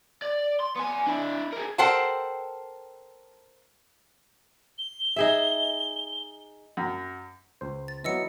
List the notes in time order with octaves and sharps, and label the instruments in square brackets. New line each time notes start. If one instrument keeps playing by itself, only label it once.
[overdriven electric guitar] D5
C6
B3 G#5
D4 E4
G#4 A#4
[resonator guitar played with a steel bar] A4 A#4 C5 F#5 G5 A5
[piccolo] G7
[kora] D#4 G#4 E5
[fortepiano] F#2
[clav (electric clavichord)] C#2 C5
[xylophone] A6
[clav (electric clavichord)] E3 F#3 B3 [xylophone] D#5 E6 C#7